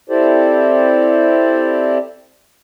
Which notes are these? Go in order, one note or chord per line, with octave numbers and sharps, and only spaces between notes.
C4 E4 G4 A4 C5 D5